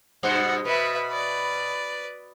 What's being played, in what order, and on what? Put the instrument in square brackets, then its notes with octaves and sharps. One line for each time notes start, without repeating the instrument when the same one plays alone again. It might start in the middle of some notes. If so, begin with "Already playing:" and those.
[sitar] G2 B2 C5 [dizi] F#5
[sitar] B2 [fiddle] B4 E5 [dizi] B5
[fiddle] B4 D5